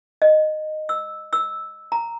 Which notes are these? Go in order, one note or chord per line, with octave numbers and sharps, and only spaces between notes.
D#5
E6
E6
A#5